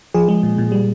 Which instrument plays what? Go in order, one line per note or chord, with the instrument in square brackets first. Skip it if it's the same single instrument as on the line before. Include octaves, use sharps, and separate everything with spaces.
[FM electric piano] F3 G#4
G#3
A#2
A#2
G3